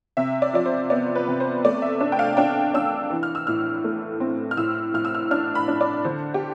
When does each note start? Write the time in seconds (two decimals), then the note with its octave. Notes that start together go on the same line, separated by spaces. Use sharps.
0.17 C3 E5
0.42 D5
0.53 F3 D5
0.66 C5
0.90 B3 D5
1.15 B4
1.28 C3
1.40 C5
1.65 A3 D5
1.82 E5
2.00 D4
2.12 G5
2.19 F5
2.37 D4 G5
2.74 D4 E6
3.10 E3
3.23 F6
3.35 E6
3.47 A2 F6
3.84 A3
4.20 C4
4.51 F6
4.57 A2 E6
4.94 A2 F6
5.05 E6
5.15 F6
5.31 D4 F6
5.55 B5
5.68 D4
5.81 D5
6.05 D3 C5
6.34 G4